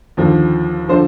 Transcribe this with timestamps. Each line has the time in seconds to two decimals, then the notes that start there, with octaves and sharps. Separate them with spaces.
0.17 D#2 D3 F3
0.89 D3 F3 C5